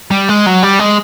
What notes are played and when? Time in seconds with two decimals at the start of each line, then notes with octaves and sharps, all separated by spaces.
0.11 G3
0.29 G#3
0.47 F#3
0.63 G3
0.80 G#3